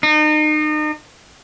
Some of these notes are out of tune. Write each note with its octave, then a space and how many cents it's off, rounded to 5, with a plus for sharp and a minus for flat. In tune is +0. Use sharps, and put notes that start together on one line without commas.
D#4 -35